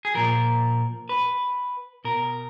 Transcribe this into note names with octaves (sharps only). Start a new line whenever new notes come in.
G#4
A#2 F3 A#4
B4
B2 A#4